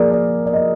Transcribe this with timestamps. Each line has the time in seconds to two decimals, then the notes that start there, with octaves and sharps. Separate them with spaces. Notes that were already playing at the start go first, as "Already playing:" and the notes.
Already playing: F3 A#3 G#4 A#4 D5
0.11 D5
0.46 D5
0.53 D#5